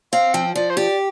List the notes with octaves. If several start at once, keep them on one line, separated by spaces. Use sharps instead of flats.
C4 F5
F3 G5
F3 D5
C5
G4 D5